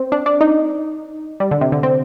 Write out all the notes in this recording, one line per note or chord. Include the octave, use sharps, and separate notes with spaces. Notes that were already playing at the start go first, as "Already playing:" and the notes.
Already playing: C4
D4
D4
D#4
G3
D3
C3
D3
C4